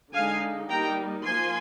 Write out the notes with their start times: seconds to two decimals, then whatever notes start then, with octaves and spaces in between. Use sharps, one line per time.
0.14 D3 G#3 D#4 F5 G#5
0.69 G3 A#3 D#4 G5 A#5
1.25 F3 A#3 F4 G#5 C6